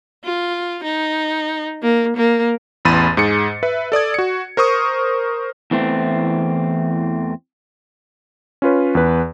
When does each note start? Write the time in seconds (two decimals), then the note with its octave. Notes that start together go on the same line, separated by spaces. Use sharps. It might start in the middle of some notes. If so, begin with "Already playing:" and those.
0.24 F4
0.84 D#4
1.82 A#3
2.17 A#3
2.85 A1 E2 B5 C6 A6 D#7
3.17 G#2 G#4 C#7
3.63 B4 E5
3.92 A4 D5 D#6 G#6
4.14 F#4 C#7
4.57 A#4 C5 C#6 D#6
5.71 E2 E3 A3 C4
8.62 C#4 F4 B4 C#5
8.95 E2 B4